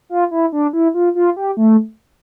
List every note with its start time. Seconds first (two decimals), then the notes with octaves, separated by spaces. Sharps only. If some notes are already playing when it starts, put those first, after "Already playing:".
0.09 F4
0.31 E4
0.52 D4
0.73 E4
0.94 F4
1.15 F4
1.36 G4
1.57 A3